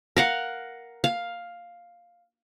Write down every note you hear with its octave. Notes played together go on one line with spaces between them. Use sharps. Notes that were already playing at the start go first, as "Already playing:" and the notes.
A#4 F5 F#5
F5